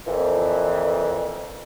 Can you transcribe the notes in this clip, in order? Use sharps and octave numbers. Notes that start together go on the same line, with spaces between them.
F2 A#2 E3